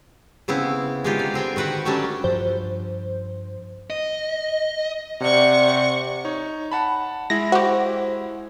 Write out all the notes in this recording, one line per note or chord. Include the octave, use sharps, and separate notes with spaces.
C#3 B3 C4 E4
G#3 D4 D#4 F4 G4
D5
D3 C4 G5 G#5
D#3 F#4 B4 F#5 G5
F#3 G3 A3 C#4 D4 A5
G2 F3 C5
D#5
C3 D5 F#5 C#6
D#4 C#5
F#5 A5 B5
G#3 E4 A#6
F#4 G4 C5